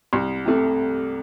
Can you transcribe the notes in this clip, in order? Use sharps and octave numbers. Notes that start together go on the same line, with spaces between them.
C2
C3 A3